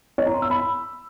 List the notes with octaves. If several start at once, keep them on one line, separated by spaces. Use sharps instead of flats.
C#5
A#5
C6
E6
B5